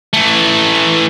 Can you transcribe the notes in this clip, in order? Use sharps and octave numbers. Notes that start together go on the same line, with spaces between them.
E3 A3